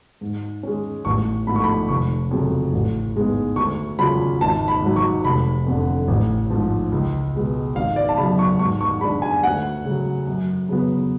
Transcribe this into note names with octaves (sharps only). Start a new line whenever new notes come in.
G#2
G#3 C#4
A1 C#6
G#2 F3 A3 B5
C#6
B5
F1 C#6
F2 C#3 F#3
A1
G#2 G#3 B3
D2 C#6
C#3 F#3 C#4 F4 B5
G#1 A5
B5
G#2 F#3
C#6
F1 B5
F2 D3
A1
G#2 F3
C#2
B2 G#3 B3
G#1 F5
D5
A5
F#2 C#3 B5
C#6
G#2 C#6
C#6
G#3 D4 B5
G#5
D2 F#5
C#3 F#3
F#2
C#3 F#3 B3